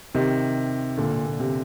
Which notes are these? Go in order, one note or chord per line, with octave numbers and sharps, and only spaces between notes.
C3 D#3
A#2 D3
A#2
A#2
C3